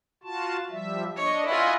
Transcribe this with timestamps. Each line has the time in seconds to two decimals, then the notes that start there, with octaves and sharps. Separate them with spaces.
0.24 F4 F#4 A5
0.70 F3 G3 E5
1.17 D4 C#5 D#5
1.46 E4 F4 D#5 F#5 G#5